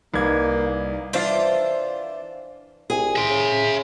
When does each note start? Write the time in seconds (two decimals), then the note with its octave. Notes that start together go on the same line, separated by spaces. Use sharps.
0.14 C2 A#3 D#4 B4 D#5 G#6
1.13 E3 D4 F4 C5 D5
2.90 C2 G#4
3.16 E5 C6
3.30 C#3